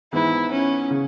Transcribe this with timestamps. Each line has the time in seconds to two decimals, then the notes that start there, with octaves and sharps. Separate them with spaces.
0.13 G#2 E3 B3 E4
0.51 C#4
0.91 C#3